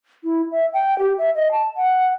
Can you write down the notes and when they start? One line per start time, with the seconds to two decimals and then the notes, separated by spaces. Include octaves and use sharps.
0.24 E4
0.51 E5
0.73 G5
0.99 G4
1.18 E5
1.35 D#5
1.51 A5
1.77 F#5